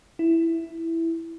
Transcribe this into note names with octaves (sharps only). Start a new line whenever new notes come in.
E4